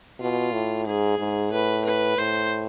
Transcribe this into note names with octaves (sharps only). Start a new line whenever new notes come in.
B2 F4
A2
G#2 G#4
G#2
A2 B4
B4
A2 C5